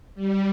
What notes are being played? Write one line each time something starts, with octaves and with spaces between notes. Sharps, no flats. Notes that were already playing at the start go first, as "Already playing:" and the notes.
G3